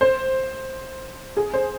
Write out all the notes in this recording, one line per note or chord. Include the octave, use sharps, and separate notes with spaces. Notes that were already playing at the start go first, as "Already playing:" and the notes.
C5
G#4
C5